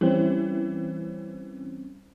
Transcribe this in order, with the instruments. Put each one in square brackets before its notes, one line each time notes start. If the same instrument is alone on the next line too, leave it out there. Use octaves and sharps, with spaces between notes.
[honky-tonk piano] E3 [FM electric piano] G3 C4 C#4